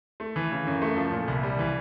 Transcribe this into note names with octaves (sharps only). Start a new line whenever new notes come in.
A3
E3
C#3
F#2
A3
F3
A#2
C2
G3
E3